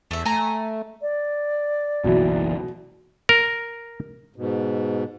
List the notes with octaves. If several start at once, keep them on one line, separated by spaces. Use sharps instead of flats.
E2 A3 E5
A3 G#5 A#5
D5
F#1 B1 B2 E3
A#4
G#2 B2